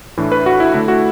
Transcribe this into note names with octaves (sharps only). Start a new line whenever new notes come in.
A2 E3 D4
B4
F#4
E4
D3 A3 D4 E4
F#4